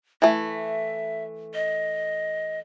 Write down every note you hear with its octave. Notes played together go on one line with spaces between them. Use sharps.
E3 A3 E5
D#5